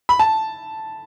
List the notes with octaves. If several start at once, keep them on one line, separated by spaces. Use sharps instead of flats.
B5
A5